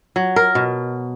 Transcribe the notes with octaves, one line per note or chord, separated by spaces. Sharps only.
F#3
A#4
B2